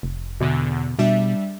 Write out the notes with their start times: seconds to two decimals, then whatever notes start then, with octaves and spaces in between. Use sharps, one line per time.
0.03 F1
0.40 E2 B2 D3
0.99 B2 G3 D4 E5